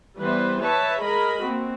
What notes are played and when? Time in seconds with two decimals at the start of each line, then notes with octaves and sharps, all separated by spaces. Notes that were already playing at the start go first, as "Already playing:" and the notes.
0.18 E3 G3 B3 B4 C5
0.61 B4 C#5 E5 A5
1.02 G#3 G#4 A#4 D#5 B5
1.42 A#3 C4 F#4